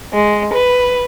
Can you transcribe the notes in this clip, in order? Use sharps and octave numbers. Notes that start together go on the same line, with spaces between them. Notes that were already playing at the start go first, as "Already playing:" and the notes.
G#3
B4